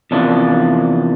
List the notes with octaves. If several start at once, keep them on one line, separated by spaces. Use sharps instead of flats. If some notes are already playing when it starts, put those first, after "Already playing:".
E2 C3 F3 A#3 D4